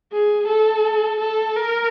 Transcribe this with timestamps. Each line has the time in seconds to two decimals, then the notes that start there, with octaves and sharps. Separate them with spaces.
0.12 G#4
0.48 A4
1.20 A4
1.56 A#4